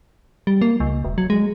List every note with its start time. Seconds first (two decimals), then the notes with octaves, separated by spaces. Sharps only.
0.47 G3
0.62 A#3
0.80 C#2
1.04 E1
1.18 F#3
1.30 G#3